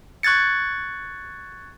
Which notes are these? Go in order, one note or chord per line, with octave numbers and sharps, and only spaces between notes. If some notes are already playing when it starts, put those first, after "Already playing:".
C#6 F#6 G#6 A6 C#7